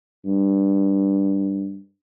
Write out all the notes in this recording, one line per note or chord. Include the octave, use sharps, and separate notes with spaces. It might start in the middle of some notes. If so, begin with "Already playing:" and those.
G2